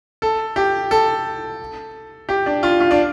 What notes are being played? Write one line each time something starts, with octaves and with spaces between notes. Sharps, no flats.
A4
G4
A4
G4
D4
F4
F4
D4